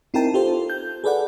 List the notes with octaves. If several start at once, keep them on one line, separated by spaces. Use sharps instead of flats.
C4 D#4 E4 A#4 G5 A5
F4 G4 A4 C5
G6
G#4 A4 B4 D5 F#5